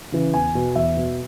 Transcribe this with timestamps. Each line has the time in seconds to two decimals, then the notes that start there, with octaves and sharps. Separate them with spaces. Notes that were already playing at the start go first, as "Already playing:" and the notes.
0.12 C#3 E3
0.34 E2 G#5
0.55 B2
0.76 E2 E5
0.97 B2